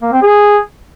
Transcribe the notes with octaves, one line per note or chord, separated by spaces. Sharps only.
A#3
C4
G#4